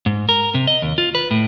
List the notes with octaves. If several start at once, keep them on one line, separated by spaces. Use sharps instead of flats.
G#2
A#4
C3
D#5
D#2
F4
B4
A2